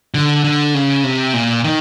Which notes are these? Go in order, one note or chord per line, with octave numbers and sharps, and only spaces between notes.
D3
D3
C#3
C3
A#2
D#3